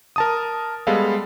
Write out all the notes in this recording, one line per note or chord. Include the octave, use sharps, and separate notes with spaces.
A#4 A5 D#6
G3 G#3 B3 A4 F5